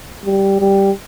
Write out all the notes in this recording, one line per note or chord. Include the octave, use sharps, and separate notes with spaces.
G3
G3